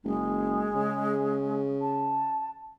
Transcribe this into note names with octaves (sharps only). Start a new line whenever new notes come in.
F#1 G#3
C#3
A5